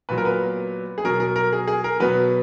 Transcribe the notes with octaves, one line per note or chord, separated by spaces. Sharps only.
A#2 F#3 B4
A#4
B3 B4
G#4
B2 F#3 A#4
A#4
A#4
G#4
G#4
A#4
B2 F#3 B3 B4